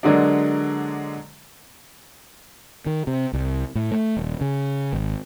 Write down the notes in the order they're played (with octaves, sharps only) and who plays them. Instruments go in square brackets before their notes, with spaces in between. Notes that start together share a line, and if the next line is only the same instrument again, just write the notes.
[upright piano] D3 F#3 G#3 A#3 D4
[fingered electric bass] D#3
C3
C2
A2
A3
D#1
C#3
G#1